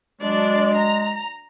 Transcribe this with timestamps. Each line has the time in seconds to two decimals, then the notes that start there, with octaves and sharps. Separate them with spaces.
0.21 F#3 G#3 D4 D5
0.78 A#5